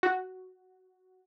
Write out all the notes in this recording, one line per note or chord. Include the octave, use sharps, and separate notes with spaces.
F#4